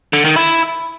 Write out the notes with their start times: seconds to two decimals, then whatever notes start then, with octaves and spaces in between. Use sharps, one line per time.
0.13 D3
0.25 D#3
0.36 E4